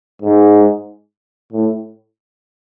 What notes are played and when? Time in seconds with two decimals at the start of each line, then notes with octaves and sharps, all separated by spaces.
0.22 G#2
1.52 A2